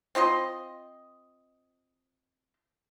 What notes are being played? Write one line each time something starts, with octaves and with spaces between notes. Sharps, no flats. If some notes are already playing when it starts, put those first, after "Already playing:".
C4 F4 D#5 C6